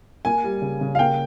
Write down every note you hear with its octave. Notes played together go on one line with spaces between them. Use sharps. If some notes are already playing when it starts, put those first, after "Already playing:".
A#3 G#5
G3
C#3
C#3
F5
A#3 G5